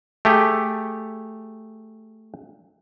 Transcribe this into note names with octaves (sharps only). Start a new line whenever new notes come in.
A3 G4 G#4